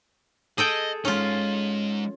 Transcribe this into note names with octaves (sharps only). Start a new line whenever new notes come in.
G#4 A4 D#5 G5
G#3 C#4 D#4 F4